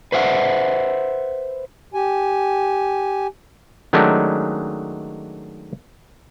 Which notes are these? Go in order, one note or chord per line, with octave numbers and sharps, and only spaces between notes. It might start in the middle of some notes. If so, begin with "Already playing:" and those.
B4 C5 E5 F#5
G4 G#5
D#3 F#3 G#3 A3 C#4 D4